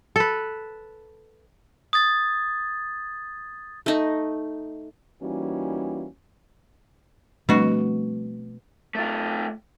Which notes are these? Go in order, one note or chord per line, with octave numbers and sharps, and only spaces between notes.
A4 B4
D#6 G#6 A6
A3 D#4
E3 G3 A#3 C#4 D#4 F#4
B2 F3 G3 A3 C4 D4 F#4 D#5
A3 F4